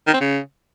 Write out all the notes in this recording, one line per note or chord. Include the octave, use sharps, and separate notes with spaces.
D#3
C4
C#3